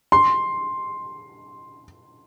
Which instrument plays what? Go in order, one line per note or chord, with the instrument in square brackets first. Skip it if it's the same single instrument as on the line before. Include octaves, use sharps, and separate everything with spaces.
[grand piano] C6